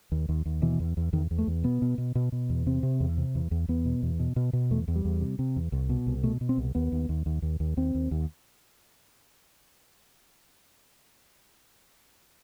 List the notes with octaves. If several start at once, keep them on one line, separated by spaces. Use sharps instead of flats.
D#2
D#2
D#2
B2 E3
E2
E2
E2 D#3
E2
A3
E2
B2 B3
B2
B2
B2
B2
E2
C3 C4
C3
E2
C3
E2
E2
E2 B3
B2
E2
B2
B2
B2
E2 A3
E2
G3
E2
C3
C3
E2
C2
B2
C2
B2 A3
B2
C4
C2
D#2 B3
D#2
D#2
D#2
D#2
D#2
D#2 C4
D#2
D#2